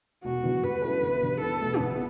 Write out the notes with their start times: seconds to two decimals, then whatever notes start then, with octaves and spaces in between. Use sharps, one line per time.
0.24 E1 F#4
0.43 E2 D3 F#3
0.63 G2 B4
0.82 F#3 C#4 E4 A4
1.02 G1
1.22 G2 D3
1.41 E2 A4
1.60 B2 A3
1.79 G1 B3